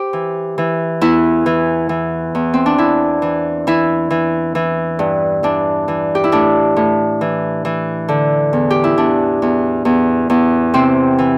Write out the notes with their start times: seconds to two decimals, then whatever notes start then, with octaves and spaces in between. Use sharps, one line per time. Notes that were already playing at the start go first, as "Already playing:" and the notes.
Already playing: G4 C5
0.13 E3
0.58 E3
1.01 E2 E4
1.46 E3
1.89 E3
2.35 E2
2.54 C4
2.66 D4
2.78 E3 E4
3.22 E3
3.67 E3 E4
4.10 E3
4.55 E3
4.99 G2
5.43 E3 D4
5.88 E3
6.15 G4
6.24 E4
6.32 A2 D4
6.76 A2
7.21 E3
7.65 E3
8.08 D3
8.53 E2
8.70 G4
8.84 E4
8.97 E2 D4
9.42 E2
9.85 E2
10.30 E2
10.74 C3 C4
11.19 E3